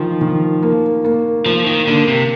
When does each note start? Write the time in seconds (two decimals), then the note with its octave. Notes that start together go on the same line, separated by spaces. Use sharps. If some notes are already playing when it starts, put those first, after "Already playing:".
Already playing: D#3 F3
0.21 D#3
0.62 A#3
1.04 A#3
1.46 F3 A#3
1.67 D#3
1.87 D3 A#3
2.07 C3